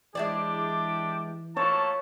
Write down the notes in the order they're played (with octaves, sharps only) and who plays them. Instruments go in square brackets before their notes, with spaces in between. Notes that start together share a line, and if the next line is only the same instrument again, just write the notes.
[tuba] E3 [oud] G#3 E4 D5 [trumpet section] D4 G4 D6
[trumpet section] A3 A#3 A5 [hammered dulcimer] C#5